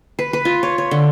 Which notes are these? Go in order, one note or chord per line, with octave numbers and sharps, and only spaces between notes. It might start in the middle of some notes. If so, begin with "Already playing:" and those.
B4
B4
F4
C#5
C#5
D3